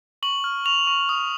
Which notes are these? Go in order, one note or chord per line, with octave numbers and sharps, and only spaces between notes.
C#6 F#7
F6
C#6 F7
C#6
D#6